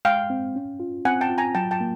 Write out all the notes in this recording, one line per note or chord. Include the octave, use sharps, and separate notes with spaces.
G#3 F5 G5
C4
C#4
F4
C4 F#5 G#5
G5 A5
F4
G#5 A#5
F#3 G5 A5
G5 A5
A#3